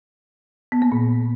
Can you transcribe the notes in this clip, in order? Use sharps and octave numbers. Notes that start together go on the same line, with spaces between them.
B3
A#3
A#2